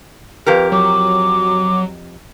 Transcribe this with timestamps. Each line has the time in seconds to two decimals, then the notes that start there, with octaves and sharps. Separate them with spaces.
0.46 F2 G4 A#4 B4
0.72 F#3 D6